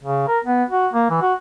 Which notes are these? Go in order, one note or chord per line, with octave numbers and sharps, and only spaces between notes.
C#3
A#4
B3
F#4
A#3
E3
F#4